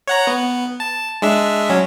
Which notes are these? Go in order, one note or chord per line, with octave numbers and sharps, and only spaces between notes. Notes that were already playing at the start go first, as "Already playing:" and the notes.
C#5 F#5 A#5
B3
A5
G#3 D4 E5
F#3 C#4